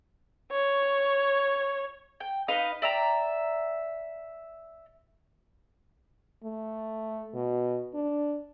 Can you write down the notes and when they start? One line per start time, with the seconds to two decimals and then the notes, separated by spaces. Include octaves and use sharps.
0.51 C#5
2.20 G5
2.48 D#4 B4 D#5 F5
2.82 D5 E5 G5 A#5
6.44 A3
7.35 B2
7.94 D4